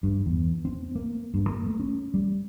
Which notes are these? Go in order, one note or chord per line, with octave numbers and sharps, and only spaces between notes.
G2
E2
C4
A#3
G2
A#3
A3
C#4
G3